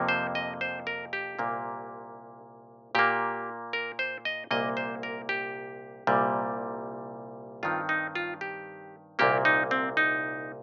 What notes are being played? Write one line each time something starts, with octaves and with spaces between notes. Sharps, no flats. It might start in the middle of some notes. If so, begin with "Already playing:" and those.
Already playing: F2 C3 F3 A#3
C5
D#5
C5
A#4
G4
C2 A#2 A#3
A#2 A#3 G4
A#4
C5
D#5
C2 A#2 A#3 D#5
C5
A#4
G4
C2 A#2 G3
G2 D#3 C4 F4
D#4
F4
G4
C2 A#2 A#3 G4
D#4
C4
D#4